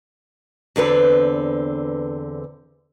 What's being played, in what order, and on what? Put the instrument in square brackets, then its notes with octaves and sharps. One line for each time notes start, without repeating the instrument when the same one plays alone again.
[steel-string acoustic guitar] E2 D3 C4 B4